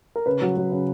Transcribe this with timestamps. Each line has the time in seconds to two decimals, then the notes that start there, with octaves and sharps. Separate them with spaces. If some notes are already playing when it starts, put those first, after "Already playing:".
0.16 A#4
0.26 C#3 B4
0.42 F#3
0.57 F#3
0.72 C#3